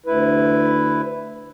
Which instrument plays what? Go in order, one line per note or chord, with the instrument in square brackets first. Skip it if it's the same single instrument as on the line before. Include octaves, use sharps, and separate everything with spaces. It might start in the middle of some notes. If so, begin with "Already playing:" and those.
[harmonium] D2 E4 B4